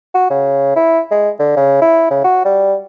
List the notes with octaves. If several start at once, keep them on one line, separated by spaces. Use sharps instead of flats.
F#4
C#3
E4
G#3
D3
C#3
E4
C#3
F#4
G3